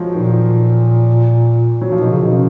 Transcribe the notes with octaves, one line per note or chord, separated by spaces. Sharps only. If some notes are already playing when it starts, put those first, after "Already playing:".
Already playing: F3 F#3 G#3
A#2 D#3
F#3
F3
B2 D#3
C#3
B2 D#3
C#3